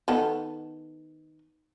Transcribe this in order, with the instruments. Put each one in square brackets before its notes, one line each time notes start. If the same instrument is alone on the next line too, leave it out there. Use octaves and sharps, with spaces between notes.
[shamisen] D#3 B3 A4